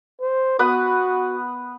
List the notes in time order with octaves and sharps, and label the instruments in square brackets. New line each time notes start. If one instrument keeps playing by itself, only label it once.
[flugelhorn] C5
[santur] B3 B4 D#6 [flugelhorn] F#4